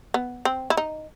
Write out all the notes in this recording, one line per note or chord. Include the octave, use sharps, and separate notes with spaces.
B3
C4
E4
D#4